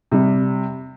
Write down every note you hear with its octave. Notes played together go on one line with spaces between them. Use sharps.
C3 G3